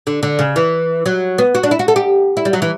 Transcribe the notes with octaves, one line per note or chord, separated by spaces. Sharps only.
D3
D3
C#3
E3
F#3
B3
F#4
D4
E4
F#4
A4
G4
E4
G3
F#3
E3